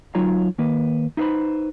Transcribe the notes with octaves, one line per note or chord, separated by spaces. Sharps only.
F#3 D#4 F4 C#5 A#5
D#3 A#3 B4
D#4 E4 A4 B4 C5 B5